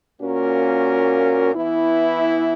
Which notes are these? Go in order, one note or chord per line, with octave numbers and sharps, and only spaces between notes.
A#2 A#3 C#4 F#4 A#4
E3 B3 E4